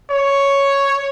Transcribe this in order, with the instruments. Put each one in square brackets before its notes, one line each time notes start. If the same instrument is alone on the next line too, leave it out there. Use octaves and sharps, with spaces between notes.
[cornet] C#5